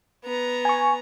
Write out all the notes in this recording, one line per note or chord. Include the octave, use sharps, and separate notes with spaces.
B3 A#5
G#5 C#6